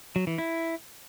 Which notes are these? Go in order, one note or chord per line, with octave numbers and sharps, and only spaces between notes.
F#3
E3
E4